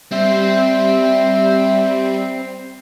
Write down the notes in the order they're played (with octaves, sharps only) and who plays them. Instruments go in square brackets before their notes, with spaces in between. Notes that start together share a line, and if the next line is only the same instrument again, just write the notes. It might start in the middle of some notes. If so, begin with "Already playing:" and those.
[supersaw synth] G3 [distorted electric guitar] C4 C5 [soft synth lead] E5